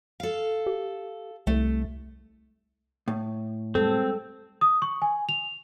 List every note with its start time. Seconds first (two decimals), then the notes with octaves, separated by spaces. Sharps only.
0.20 A4 F5
0.67 G4
1.47 C2 A3
3.08 A2
3.75 G3 G#3 C4 A4
4.61 D#6
4.82 C#6
5.02 G#5
5.29 F7